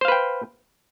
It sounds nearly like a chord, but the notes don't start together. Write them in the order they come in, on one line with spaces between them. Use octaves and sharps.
C5 F5 B4 G5